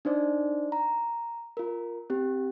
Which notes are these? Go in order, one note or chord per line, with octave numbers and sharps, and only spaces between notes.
D4 D#4 C5 D5
A#5
F4 A#4
C4 G4